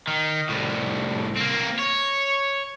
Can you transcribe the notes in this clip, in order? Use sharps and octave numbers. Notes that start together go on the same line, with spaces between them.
D#3
C2 A2
A#3 C4
C#5